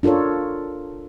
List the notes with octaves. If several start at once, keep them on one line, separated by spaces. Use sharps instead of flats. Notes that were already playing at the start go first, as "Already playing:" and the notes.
D4 F4 A4 A#4 C#5